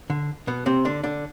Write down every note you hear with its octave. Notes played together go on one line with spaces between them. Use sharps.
D3
B2 B3
C3 C4
D3 D4
D3 D4